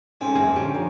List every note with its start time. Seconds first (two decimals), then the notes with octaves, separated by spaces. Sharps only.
0.21 G#2 C4 C#4 A4 G#5
0.36 F#2 A#3 G#4
0.56 A#2 D3 C#4 D4 G4
0.74 F3 A#4 C#5